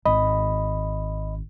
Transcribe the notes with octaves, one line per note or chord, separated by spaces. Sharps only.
G#1 D#5 B5